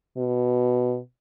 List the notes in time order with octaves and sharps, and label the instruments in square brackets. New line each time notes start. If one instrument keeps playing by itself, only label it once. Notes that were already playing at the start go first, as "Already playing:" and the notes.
[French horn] B2